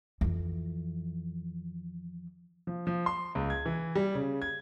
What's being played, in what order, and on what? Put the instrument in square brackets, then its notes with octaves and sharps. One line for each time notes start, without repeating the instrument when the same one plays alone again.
[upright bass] F2 E3
[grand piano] F3
F3
C6
C#2
G#6
E3
G3
C#3
G#6